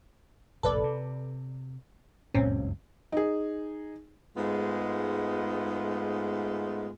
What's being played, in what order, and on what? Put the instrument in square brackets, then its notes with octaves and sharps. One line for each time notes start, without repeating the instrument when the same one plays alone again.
[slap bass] F1 A#1 A2 [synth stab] A4 B4 D5
[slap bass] C3
[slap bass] F#1 C#2 G2 [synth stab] A#2 C4 C#4
[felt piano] D#4 G#4
[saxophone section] G#2 G#3 A3 B3 F4